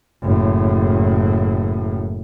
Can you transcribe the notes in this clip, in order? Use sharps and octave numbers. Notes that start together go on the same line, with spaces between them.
F#1 A2